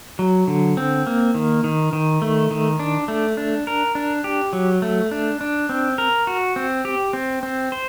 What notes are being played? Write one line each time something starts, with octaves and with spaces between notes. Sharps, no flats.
F#3
D3
C4
A#3
D#3
D#3
D#3
A3
D#3
D4
A3
D4
A#4
D4
G4
F#3
A3
D4
D4
C4
A#4
F#4
C4
G4
C4
C4
C5